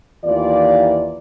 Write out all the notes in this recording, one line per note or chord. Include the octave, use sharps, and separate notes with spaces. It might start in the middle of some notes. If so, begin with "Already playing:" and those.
D#2 E3 A#3 F4 D5